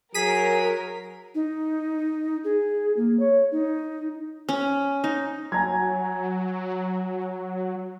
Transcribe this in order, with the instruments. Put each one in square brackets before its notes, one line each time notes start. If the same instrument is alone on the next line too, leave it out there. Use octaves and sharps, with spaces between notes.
[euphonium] F#3 [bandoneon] G#4 [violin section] A#4 [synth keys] B6 D#7
[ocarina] D#4
G#4
A#3
C#5
D#4
[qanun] C#4
D#4
[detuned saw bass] F#3 [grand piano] G#5 A#5 G#6